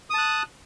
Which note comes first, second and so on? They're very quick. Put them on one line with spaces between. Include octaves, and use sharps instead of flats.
D#6 A5 F#6